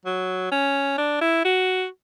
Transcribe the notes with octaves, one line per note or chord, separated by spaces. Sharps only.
F#3
C#4
D4
E4
F#4